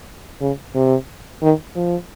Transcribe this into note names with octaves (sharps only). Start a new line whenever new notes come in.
C#3
C3
D#3
F3